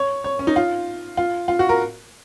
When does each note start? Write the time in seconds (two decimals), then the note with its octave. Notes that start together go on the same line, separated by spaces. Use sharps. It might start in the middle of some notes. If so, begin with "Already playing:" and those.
Already playing: C#5
0.24 C#5
0.39 C#4
0.47 D#4
0.56 F4
1.17 F4
1.48 F4
1.59 F#4
1.69 A#4